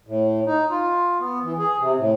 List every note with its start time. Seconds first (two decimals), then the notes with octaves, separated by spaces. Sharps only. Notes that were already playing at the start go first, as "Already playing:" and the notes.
0.07 A2
0.46 D#4
0.70 F4
1.20 B3
1.43 E3
1.58 G#4
1.79 C3
1.98 A2